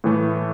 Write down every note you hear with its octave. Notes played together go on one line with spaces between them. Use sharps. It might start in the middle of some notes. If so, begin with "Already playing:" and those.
A2 E3 A3